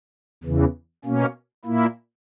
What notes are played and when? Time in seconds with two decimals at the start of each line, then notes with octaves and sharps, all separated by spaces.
0.44 E2 C#3 E3
1.05 B2 A#3 C#4
1.65 A#2 A#3 E4